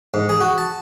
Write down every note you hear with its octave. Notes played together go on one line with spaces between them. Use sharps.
G#2
G#4
F#4
A5